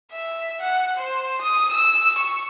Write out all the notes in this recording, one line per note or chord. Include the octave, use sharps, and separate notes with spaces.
E5
F#5
C5
D#6
E6
C#6